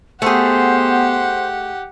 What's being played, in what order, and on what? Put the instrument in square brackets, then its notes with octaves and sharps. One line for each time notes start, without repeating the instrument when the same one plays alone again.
[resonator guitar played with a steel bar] A3 G#4 [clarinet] B3 [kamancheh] G4 F#5 [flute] C5